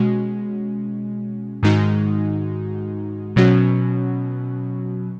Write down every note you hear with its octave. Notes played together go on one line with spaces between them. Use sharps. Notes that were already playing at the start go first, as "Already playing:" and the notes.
Already playing: B2 G#3 C#4 F#4
G#2 D#3 G#3 D#4 F#4
B2 F#3 C#4 F#4